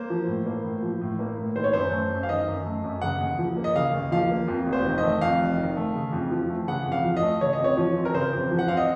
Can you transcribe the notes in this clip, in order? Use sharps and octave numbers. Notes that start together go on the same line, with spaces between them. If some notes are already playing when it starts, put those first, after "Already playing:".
Already playing: A#3 C5
F3
A2
A#3
A2
F3
A2
A#3
A2
D#3 C5
C#5
F#2 C5
A3
F#2
F5
D#3 D#5
F#2
A3
F#2
C#3 F#5
D#2
F3
A#3
D#5
C#3 F5
D#2
F3 F5
A#3
F2
F1
C5
D#3
D#5
A3
F2 F5
F1
D#3
A3
C#3
F2
F3
A3
C#3 F#5
F2
F5
F3
D#5
A3
C#3 C#5
D#5
F2
C#5
F3
C4
A#4
C#3 C5
F2
F3
F#5
C4 F5
D#5